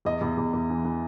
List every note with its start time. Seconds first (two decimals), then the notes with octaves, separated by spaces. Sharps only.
0.05 E2 D#5
0.21 E2
0.38 E2
0.53 E2
0.70 E3
0.84 E3